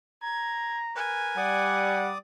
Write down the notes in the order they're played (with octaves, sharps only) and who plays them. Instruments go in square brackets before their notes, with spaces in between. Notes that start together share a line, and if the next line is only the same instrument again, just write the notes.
[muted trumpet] A#5 [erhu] G#6
[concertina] A#4 B4 [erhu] G#5
[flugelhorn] G3 [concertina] D5 D6 D#6 [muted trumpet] F#5